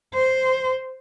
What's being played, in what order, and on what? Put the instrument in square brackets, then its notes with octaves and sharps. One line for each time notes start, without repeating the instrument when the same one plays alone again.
[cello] C5